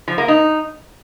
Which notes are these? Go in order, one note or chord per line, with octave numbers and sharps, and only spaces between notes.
F3
A#3
D#4